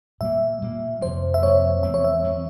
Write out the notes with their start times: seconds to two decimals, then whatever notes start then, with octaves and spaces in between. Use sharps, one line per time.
0.21 A#2 G3 A#3 E5
0.62 A#2 G3 A#3
1.01 F2 C3 F3 A#3 C5
1.34 E5
1.42 F2 C3 F3 A#3 C#5
1.83 E2 E3 G#3 C4 E5
1.94 C#5
2.05 E5
2.23 E2 E3 G#3 C4